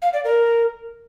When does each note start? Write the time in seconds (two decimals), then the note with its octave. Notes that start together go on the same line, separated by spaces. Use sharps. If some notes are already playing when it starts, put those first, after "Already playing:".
0.02 F5
0.13 D5
0.24 A#4